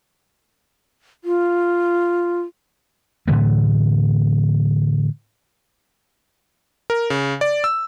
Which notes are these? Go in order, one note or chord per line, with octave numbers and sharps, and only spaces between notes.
F4
A2 D3 E3 A3
A#4
C#3
D5
E6